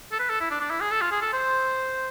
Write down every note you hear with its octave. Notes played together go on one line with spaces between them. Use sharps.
A4
B4
A4
E4
D4
D4
E4
G#4
A4
F4
G#4
A4
C5